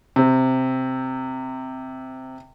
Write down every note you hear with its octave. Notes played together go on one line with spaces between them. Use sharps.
C3 C4